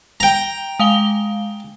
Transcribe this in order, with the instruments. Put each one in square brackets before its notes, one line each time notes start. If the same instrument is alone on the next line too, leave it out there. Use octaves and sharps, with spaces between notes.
[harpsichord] G5 A#5
[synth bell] G#3 F5 G7